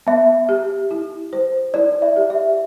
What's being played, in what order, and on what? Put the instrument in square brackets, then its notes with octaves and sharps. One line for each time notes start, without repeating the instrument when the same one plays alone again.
[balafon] B3 [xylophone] E5
[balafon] G4
E4
C5
[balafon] E4 [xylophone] D5
[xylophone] E5
[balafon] G4
[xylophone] E5